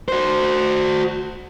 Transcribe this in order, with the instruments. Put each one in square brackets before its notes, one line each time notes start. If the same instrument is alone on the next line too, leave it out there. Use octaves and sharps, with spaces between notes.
[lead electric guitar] F#4 C5